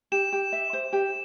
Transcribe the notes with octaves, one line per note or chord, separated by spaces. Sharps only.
G4 E7
G4
E5
C5
G4